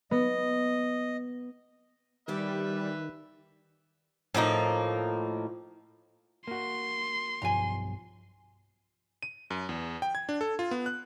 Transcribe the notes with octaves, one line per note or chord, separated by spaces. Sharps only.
B3 D#5
G2 D#3 G3 G4 B4 D5 E5
A2 F3 A#3 D#4
A#3 F#4 C6
B1 G2 F3 G#5 A#5
D#7
F#2
E2
G5
G#6
D4
A4
F4
B3
F#6